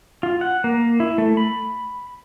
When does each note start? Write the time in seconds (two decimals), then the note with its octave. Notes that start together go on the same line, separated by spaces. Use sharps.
0.23 F4
0.41 F#5
0.64 A#3
1.00 E4
1.18 A3
1.37 B5